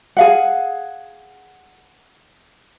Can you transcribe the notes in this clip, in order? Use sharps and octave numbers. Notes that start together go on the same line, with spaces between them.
G#4 F5 F#5